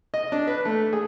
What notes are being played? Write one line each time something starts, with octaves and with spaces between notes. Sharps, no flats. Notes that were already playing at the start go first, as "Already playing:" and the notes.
D#5
D4
B4
A3
G#4